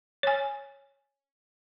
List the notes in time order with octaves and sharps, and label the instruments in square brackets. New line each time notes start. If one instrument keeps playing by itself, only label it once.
[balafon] C#5 G#5